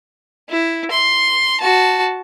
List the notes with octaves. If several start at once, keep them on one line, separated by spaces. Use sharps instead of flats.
E4
C6
F#4 A5